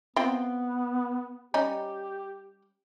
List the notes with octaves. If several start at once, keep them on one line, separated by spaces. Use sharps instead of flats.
B3 C4 F4 G5
G3 C#4 D#4 G4